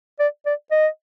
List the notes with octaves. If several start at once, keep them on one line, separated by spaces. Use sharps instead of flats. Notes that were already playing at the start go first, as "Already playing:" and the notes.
D5
D5
D#5